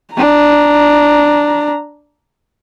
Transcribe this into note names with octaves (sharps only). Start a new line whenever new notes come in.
D4 A#5